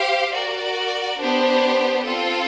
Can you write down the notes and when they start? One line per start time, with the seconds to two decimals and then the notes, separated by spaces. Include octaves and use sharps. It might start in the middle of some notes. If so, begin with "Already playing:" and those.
Already playing: G4 C5 F5
0.33 F#4 A#4 D5
1.19 B3 D4 G4 C5
2.05 C4 F4 A4